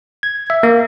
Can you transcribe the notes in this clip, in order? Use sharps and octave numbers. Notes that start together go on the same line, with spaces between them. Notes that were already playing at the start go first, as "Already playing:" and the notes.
G#6
E5
A#3